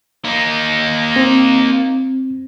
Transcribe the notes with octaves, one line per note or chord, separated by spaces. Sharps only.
A#3 D#4
C4